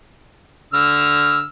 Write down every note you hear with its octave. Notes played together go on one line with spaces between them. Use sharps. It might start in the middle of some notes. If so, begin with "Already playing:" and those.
D3 E6 F6